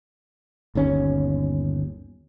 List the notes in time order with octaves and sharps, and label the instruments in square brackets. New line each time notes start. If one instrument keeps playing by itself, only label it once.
[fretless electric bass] G1 D#2 C#4